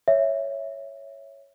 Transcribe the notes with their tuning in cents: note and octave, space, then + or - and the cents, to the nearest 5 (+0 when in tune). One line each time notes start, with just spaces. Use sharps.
C#5 +0 E5 +0